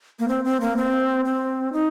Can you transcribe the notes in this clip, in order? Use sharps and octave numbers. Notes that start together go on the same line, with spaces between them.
A#3
C4
C4
A#3
C4
C4
D#4